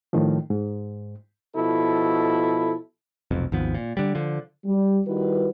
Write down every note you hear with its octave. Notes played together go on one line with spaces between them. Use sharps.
A2 D#3 F3
G#2
B2 F3 E4 A4
F1 B1 F2
G#1 D#2 F3 B3
A#2
D3 G3
D3 F3
G3
D#3 G3 E4 F#4 B4